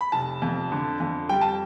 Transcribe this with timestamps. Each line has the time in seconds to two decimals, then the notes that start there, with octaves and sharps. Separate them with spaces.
0.01 B5
0.12 F1 A5
0.42 F2
0.72 D3
1.00 F2
1.29 G3 G5
1.41 A5